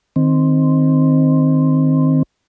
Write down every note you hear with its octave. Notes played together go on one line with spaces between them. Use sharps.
D#3 C4